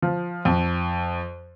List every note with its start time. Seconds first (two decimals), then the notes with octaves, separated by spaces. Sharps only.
0.02 F3
0.45 F2